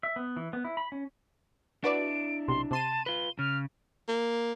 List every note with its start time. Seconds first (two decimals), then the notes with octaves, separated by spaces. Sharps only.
0.03 E5
0.16 B3
0.37 E3
0.53 B3
0.64 E4
0.77 B5
0.92 C#4
1.84 D4 E4 F#4 B4 D5 D7
2.48 B1 C3 C6
2.71 C3 A5 C6 D#7
3.06 F4 B4 G7
3.39 C#3 F6
4.08 A#3